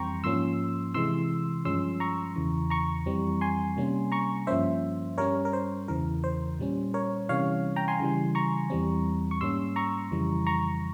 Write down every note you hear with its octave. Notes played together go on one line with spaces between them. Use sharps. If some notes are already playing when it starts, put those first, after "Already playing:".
Already playing: F2 E3 G3 C4 G5 A#5 C6 C#6
G#2 F3 A#3 C#4 C6 E6
C3 E3 G#3 C6 E6
G2 F3 G#3 C#4 C6 E6
A#5 C#6
E2 C#3 E3
A#5 C#6
F2 E3 G3 C4
G#5 C6
C3 G3 A#3 C#4
A#5 C#6
G2 F3 A#3 C#4 C5 E5
G2 G3 C#4 A#4 C#5
A#4
C5
E2 C#3 E3 A#4
C5
A#2 G3 C#4
A#4 C#5
C3 E3 G3 C#4 C#5 F5
G5 A#5
G#5 C6
C#3 E3 G3
A#5 C#6
E2 E3 G3 C4
C#6
G#2 G3 A#3 C#4 C6 E6
A#5 C#6
F2 C#3 E3 G3
A#5 C#6